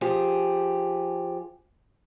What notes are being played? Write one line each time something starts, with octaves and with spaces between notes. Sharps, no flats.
F3 G4 G#4